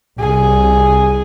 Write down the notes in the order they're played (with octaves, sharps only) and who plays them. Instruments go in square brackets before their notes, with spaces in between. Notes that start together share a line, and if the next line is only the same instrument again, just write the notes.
[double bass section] C2 [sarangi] G#4